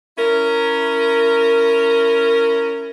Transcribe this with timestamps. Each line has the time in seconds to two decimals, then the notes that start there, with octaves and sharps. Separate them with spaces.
0.18 C#4 E4 A#4